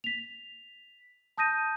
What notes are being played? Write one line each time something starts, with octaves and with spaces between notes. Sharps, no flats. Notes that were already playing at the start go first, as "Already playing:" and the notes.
B6 F7
A5 D#6 G6 A#6 D#7